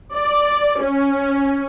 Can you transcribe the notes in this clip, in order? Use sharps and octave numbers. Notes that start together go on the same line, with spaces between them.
D5
C#4